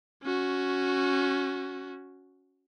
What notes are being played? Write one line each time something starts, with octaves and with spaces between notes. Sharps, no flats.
C#4 F#4